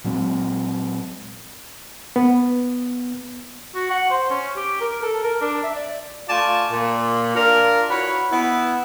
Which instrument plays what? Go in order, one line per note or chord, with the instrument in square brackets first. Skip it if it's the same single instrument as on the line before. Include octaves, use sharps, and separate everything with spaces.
[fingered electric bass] A#2 F#3 G#3 C4
[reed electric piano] B3
[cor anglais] F#4
F#5
C5
C#4
G4
A#4
A4
A#4
D4
E5
D5
[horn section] A3 F4 D5 G#5 A5
A#2
D4 F4 A#4
E4 F#4 B4 C#5
B3 E4